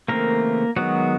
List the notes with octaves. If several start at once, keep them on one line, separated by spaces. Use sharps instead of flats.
C#3 E3 A3 A#3 C4 A#4
D#3 F#3 G#3 B3 F#4